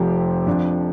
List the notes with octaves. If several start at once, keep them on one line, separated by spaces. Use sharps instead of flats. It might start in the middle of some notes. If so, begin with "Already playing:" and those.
Already playing: F1 F2 F3 C4 G4
F2 F3 D4